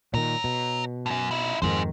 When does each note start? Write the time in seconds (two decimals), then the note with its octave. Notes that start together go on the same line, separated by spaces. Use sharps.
0.14 A#2 D#3 C#5 A#5
0.44 B2
1.06 F#2 A2
1.31 D#4 E4
1.62 F2 G#2 D#3 G#4 C5